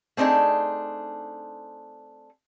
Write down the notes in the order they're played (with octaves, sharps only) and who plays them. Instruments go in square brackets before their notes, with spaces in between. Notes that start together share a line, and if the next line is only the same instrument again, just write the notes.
[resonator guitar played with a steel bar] A3 C4 D4 D#4 G#4